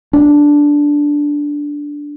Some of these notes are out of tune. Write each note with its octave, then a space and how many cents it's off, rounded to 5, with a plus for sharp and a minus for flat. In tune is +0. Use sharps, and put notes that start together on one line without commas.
D4 -5